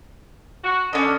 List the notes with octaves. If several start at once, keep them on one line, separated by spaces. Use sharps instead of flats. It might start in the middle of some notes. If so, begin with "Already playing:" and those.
F#4
D3 C#4 D#5